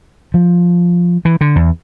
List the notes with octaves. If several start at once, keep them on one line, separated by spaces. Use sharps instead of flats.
F3
E3
D3
E2